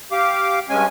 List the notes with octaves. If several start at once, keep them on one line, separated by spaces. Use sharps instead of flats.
G4 F5 D6
G2 G#3 C#4 G#5